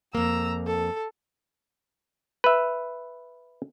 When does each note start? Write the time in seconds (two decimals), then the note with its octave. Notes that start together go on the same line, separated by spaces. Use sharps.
0.15 F2 A#3 A#5 E6
0.67 A4
2.44 B4 E5